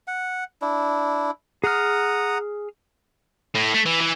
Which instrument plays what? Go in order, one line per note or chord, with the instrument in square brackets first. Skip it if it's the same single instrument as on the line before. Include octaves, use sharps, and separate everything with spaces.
[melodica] F#5
D4 E4
[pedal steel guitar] G#4 F6 [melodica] F#5 A#5 D#6
[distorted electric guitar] A2
A3
E3
E3